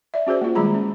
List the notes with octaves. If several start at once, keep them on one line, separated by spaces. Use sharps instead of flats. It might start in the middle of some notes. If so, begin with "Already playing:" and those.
D5 E5
C#4 F#4 G#4 C5 D5
A#3 F4
D#3 G3 G#3 G#4 A#5 B5
C#4